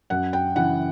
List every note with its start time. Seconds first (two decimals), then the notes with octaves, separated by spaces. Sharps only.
0.10 F#2 F#5
0.33 G5
0.56 C#3 E3 F#5